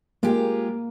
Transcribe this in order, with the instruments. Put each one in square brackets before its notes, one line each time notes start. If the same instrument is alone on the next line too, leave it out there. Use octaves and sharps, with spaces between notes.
[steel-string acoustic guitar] G#3 F4 G4 [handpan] A#3